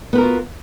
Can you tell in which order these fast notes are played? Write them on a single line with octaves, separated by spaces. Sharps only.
B3 B4 A#4 F#4 F4